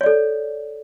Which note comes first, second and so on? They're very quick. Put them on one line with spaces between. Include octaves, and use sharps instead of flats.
C#5 D5 A4